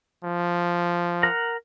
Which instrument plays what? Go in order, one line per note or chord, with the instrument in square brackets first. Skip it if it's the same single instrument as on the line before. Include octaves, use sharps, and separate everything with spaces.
[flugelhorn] F3
[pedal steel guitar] A#4 F#5 A#5